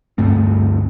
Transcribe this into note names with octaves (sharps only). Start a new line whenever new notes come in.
D2 G2 A3 C4